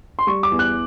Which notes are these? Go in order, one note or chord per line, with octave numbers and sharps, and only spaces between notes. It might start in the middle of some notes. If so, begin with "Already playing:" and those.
C6
G3 C#6
D6
E2
F#6